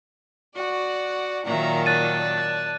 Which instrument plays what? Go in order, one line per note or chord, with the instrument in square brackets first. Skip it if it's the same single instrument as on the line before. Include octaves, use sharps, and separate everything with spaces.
[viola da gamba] F#4 [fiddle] D5 F#5
[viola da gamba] A#2 D#3 F#3 [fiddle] E5 A#5
[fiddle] D5 A5 [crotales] F#6 A6 D#7
[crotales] F#6